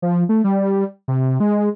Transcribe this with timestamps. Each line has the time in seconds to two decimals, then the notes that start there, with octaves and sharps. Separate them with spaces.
0.02 F3
0.29 A3
0.44 G3
1.08 C3
1.40 G#3